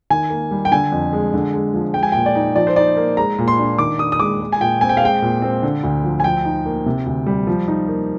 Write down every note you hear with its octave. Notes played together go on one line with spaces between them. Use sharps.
D#3 G#5
A#3
G3
G5
D3 G#5
F2
G#3
D3
G#3
F3
G#3 G5
G#5
A#2 G5
D5
D#4
F3 D5
C5
D#4 D5
A#3
G#3 A#5
A#2
C6
D4
D#3 D6
D4 D#6
D#6
G#3 D6
G#3
G#5
A#2 G5
C4 G#5
G5
F5
G#3 G5
A#2
C4
D3
D2
F3
G#5
F3 G5
D#4
A#3
C3
D2
G3
F3
D#4
A#3